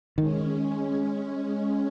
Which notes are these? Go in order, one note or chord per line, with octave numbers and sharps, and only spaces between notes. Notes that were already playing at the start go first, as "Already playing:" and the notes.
D#3 G#3 C#4